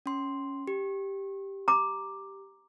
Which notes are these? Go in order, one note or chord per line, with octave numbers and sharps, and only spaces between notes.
C#4 C6
G4
A#5 D6